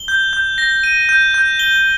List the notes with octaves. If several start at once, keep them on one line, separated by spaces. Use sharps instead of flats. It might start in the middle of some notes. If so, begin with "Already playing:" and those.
Already playing: G7
G6
G6
A#6
D#7
G6
G6
G7